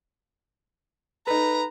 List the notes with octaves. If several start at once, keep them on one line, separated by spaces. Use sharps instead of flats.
D#4 A4 B4 A#5